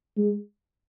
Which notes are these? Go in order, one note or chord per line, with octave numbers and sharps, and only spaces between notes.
G#3